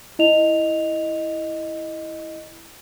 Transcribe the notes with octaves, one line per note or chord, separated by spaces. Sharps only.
E4 D#5 F7